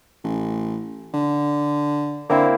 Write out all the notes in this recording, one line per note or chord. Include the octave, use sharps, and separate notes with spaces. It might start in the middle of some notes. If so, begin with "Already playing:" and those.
A1
D3
D3 A#3 C4 E4